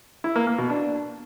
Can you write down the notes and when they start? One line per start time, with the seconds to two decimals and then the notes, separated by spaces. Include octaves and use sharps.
0.24 E4
0.36 A#3
0.47 A#3
0.58 B2
0.70 D4